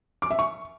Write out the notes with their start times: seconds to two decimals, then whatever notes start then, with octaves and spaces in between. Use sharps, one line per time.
0.22 D6
0.30 E5
0.39 C#6